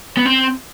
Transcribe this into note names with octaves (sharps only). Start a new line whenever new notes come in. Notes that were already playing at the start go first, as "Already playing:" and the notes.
B3
C4